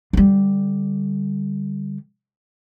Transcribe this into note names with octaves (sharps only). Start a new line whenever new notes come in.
D3 G3